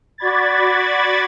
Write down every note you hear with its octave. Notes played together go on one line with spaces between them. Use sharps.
F#4 D5 B5 G#6 A6